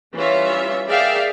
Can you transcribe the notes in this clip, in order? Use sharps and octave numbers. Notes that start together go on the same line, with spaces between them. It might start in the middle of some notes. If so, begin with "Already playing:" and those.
E3 G3 C#4 F4 C#5 E5
G#4 A#4 D5 E5 F5 G5